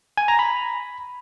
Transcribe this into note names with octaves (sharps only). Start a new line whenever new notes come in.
G#5
A#5
B5